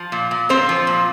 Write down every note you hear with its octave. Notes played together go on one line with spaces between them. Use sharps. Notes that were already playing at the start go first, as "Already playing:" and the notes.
Already playing: F3
A#2
A#2
A#2 C4 C5
F3
A#2